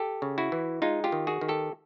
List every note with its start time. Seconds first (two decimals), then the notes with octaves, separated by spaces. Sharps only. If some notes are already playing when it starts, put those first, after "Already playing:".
Already playing: G4 A4
0.22 C#3
0.38 E4 F#4
0.52 E3
0.82 G#3 D#4 F4
1.04 F4 G4
1.12 D#3
1.27 F#4 G#4
1.41 D#3
1.48 G4 A4